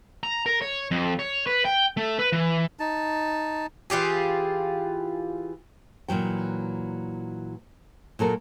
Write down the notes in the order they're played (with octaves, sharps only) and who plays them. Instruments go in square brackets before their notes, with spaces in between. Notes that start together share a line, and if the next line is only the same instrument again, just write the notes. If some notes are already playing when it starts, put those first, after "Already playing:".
[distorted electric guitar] A#5
A#4
C#5
F2
C#5
B4
G5
A3
B4
E3
[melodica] D#4 A5
[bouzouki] E3 F4 G4 G#4
[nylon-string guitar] A#2 E3 F#3 G5
A#2 F#3 A4 A#4